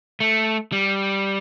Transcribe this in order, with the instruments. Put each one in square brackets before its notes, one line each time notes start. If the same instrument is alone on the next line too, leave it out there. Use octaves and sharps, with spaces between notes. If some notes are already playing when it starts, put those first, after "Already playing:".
[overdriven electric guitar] A3
G3